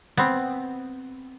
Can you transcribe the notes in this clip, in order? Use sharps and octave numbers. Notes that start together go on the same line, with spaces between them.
B3 C4